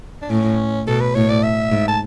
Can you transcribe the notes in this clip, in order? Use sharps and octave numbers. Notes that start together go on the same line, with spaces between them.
D4
A2 C#4
B2 A4
B4
A2 C#5
D5
E5
G#2
A5